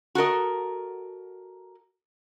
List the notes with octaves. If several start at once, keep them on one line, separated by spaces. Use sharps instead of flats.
F#4 A4 A#4 D#5